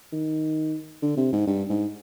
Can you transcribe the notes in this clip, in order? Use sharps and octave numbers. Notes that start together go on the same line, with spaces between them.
D#3
D3
C3
G#2
G2
G#2